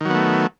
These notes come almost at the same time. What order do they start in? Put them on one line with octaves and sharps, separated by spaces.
D#3 F#3 B3 A3